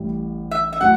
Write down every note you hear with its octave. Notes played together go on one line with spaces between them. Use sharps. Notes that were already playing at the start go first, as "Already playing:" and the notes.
Already playing: A1 A2 G3
E5
E5
A2 F#3 F#5